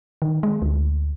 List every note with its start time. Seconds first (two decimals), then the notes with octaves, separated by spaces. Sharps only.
0.22 D#3
0.43 G#3
0.62 D2